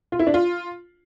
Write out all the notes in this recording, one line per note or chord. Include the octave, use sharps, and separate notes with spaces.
F4
E4
D4
F4